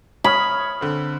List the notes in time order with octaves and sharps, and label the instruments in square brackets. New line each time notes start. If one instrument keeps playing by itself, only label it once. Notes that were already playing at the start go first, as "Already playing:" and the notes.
[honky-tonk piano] C#5 D#6 F6 [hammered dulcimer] B5
[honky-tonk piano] D3 C4